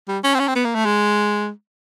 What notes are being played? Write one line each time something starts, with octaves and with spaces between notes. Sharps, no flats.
G3
C#4
C4
C#4
C4
B3
A#3
A3
G#3